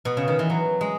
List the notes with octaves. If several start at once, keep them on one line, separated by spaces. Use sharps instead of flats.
B2
C#3
D#3
E3
F#3
G#3